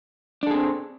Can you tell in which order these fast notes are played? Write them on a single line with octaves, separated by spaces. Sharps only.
D4 A4 G#4 C4